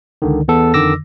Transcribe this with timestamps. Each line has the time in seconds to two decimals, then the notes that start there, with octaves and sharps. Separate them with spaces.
0.22 C#2 D3 D#3
0.48 E2 B3 A4
0.74 F2 D3 D#3 D6 E6 A#6